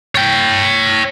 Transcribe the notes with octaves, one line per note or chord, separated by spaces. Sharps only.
C#5 G5